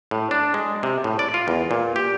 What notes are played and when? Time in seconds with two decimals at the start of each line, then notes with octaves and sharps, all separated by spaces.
0.11 A2
0.31 D4
0.54 G#3
0.83 C3
1.04 A2
1.19 D5
1.34 F4
1.48 E2
1.71 A#2
1.96 G4